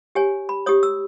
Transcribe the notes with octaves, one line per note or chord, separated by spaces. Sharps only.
G4 C#5 G#5
B5
G4 C#5 D#6
E6